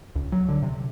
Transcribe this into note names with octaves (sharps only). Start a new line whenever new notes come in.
C#2
F#3
D3
C3